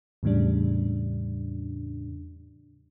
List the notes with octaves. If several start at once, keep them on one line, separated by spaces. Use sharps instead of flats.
E2 A2 C#3 G3 D4